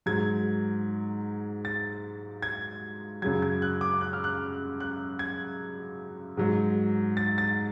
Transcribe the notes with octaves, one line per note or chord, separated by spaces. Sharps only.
G#2 F#3 G#6
A6
G#6
F#2 C#3 F#3 G#6
G#6
F#6
D6
F#6
F6
F#6
F#6
G#6
G#2 F#3
A6
A6